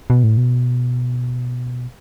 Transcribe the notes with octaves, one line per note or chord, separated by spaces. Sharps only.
B2
A2
B2